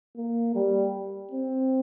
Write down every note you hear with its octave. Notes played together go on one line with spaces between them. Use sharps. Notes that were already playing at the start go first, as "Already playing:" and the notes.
A#3
G3
C4